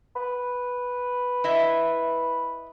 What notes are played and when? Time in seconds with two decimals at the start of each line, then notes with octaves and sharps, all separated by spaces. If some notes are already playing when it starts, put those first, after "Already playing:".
0.16 B4
1.44 E4 D#5 E5